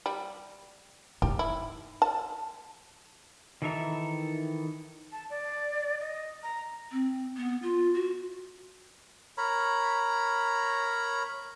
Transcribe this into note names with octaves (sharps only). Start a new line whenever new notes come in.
G3
D#4 G4
E4
A5
D#3 E3 A4 E5 A#5
A5
D5
D#5
A#5
C4
B3
F4
F#4
A#4 C#5 A#5 B5